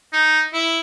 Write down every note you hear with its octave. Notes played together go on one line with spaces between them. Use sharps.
D#4
E4